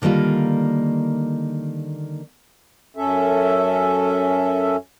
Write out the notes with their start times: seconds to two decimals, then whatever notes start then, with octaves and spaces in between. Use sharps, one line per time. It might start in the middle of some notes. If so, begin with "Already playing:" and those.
0.02 D3 D#3 G3 A#3 F4
2.97 F#2 C#4 A4 E5